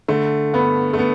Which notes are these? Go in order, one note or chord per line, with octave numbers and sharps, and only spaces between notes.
D3 A3
G2 B3
A3
B3